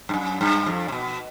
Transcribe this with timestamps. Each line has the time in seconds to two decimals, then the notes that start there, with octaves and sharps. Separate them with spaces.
0.09 G2
0.14 F#2
0.41 G2
0.66 F2
0.88 C3
0.92 B2